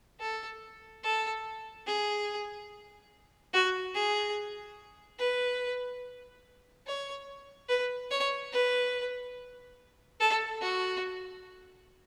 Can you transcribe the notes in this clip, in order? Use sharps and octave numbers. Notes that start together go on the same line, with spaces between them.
A4
A4
G#4
F#4
G#4
B4
C#5
B4
C#5
B4
A4
F#4